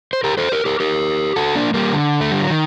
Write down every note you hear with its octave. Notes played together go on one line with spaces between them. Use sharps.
C5
G4 A#4
A4 C5
G4 A#4
G4 A#4
G4 A#4
F#4 A4
A#3 D4
G3 A#3
D3
A3
G3
F#3
D#3